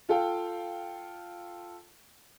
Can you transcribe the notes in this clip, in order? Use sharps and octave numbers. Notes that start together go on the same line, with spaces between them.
F4 A4 F5 G5